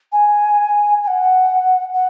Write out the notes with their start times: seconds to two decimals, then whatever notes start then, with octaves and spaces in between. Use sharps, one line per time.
0.12 G#5
1.03 G#5
1.07 F#5
1.93 F#5